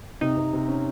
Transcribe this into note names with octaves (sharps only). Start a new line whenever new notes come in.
C3 D#4
C3
C3
C#4